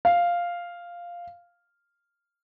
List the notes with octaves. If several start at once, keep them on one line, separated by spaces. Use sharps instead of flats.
F5